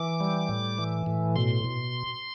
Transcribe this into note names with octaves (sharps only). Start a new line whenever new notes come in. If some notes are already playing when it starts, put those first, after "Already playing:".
Already playing: E3 D6
G3
A2
E3
A2
B2 C6
B2